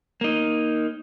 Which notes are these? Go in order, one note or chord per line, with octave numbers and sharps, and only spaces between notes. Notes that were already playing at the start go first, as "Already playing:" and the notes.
A#3 D#4